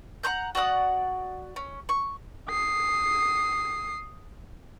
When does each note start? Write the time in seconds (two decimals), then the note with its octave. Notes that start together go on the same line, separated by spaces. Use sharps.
0.23 F#5 A#5 C6 G6
0.55 F#4 D5 F#5 D#6
1.56 C#4
1.89 C#6
2.49 D#6 C7